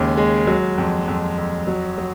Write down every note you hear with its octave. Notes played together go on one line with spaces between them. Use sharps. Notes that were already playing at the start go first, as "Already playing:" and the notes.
Already playing: D#2 C#3 G#3
G#3
F#3
F2
F2
F2
F#3
F#3